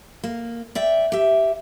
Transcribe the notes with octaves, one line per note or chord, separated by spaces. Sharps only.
A#3
D5 E5 G5
G4 E5